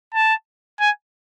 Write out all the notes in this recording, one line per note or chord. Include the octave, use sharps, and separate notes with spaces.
A5
G#5